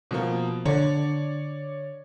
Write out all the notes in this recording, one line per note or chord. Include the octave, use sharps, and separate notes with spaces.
B2 F3 A#3
D3 C#5 D5